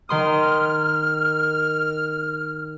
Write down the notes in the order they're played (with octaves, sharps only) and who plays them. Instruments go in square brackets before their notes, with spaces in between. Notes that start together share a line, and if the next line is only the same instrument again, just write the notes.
[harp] D#3 C6 D#6 [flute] F6